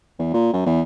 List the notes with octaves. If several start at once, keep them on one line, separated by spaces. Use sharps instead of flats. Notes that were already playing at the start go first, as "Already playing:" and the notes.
E2
A#2
F#2
E2